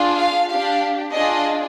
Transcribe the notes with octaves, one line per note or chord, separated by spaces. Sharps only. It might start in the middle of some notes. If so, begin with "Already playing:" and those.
Already playing: D4 F4 G#4
F5
D4 G4 F5
D4 F4 G#4 D#5